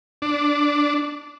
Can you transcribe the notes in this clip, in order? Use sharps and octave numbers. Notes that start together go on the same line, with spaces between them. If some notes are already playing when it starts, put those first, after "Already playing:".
D4